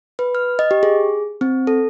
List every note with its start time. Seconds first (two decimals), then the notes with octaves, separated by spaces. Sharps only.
0.19 B4
0.35 F6
0.59 D#5
0.71 G4
0.83 G#4
1.41 C4
1.67 A4